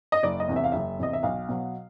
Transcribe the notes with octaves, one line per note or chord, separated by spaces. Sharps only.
D#5
F#1 D5
D#5
E2 C3
E5
F5
F#1 E5
E2 C3 D#5
E5
B1 F5
B2 F#3